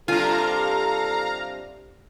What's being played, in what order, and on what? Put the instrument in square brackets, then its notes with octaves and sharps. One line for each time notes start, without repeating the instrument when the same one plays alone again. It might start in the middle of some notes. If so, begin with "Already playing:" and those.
[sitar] C3 G3 D4 [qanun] F4 G#5 [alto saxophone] A4 [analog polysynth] F5 A#5